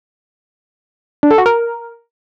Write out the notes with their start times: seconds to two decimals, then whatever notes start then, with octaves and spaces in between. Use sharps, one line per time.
1.23 D4
1.31 A4
1.38 F#4
1.46 A#4